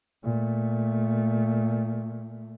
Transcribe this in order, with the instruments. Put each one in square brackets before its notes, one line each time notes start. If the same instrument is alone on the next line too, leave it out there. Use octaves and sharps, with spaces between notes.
[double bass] A#2 A3